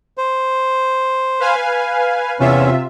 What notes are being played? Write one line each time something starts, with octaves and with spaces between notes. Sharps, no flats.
C5
B4 F5 G#5
E2 C3 C#4 F4 E5